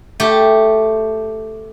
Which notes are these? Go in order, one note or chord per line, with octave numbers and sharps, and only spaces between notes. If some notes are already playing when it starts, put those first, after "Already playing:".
A3 G4